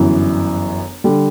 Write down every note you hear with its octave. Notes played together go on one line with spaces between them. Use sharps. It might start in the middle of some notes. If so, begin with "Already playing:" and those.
Already playing: G1 F#2 E3
D3 G3